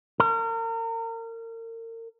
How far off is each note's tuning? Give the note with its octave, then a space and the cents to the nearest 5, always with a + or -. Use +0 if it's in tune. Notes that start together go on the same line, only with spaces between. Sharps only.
A#4 -35